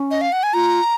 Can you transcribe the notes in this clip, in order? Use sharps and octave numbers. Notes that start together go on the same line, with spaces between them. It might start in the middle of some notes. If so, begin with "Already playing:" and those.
Already playing: C#4
D#5
F5
F#5
G#5
F4 A#5